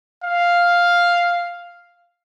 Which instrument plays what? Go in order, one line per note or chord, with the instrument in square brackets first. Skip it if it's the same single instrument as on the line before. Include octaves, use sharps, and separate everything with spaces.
[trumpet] F5